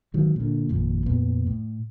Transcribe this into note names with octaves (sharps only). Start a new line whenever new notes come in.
G#2 D#3 F#3
A#2 D3
G#1 F2 A#2
F2 A#2 B3
A2